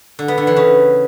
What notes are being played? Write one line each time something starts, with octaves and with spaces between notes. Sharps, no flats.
D3
B3
D3
E3
C#3